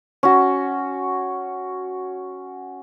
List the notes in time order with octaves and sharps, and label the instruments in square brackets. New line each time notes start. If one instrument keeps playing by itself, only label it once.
[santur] C#4 F#4